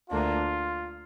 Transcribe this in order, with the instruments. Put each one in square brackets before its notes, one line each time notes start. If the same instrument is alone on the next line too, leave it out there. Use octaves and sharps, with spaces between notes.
[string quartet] D2 D3 A#3 D4 [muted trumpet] F4